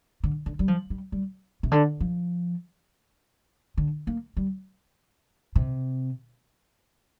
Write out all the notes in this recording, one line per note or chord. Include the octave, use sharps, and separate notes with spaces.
D3
D3
G3
F3
G3
G3
C3
D3
F3
D3
A#3
G3
C3